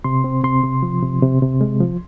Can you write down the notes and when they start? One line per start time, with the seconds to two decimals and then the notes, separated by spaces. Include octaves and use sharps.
0.04 C3 C6
0.24 C4
0.44 C3 C6
0.64 C3
0.83 F3
1.02 C3
1.22 C3
1.42 C3
1.61 G#3
1.80 F3